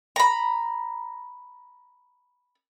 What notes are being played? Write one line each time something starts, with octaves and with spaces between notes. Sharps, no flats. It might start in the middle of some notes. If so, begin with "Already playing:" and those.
A#5 B5